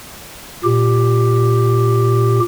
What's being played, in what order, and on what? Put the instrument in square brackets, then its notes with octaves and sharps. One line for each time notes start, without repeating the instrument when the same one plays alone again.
[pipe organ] A#2 G4